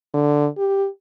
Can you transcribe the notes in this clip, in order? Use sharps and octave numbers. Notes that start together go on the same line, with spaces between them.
D3
G4